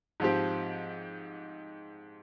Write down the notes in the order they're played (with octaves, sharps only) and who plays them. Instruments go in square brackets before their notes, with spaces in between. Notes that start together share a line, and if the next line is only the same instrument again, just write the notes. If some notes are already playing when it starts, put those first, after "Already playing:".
[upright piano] G#2 F3 C4 G4